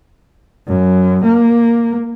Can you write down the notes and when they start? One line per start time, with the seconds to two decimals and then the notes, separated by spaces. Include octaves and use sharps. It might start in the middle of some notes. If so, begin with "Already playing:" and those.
0.67 F#2
1.24 A#3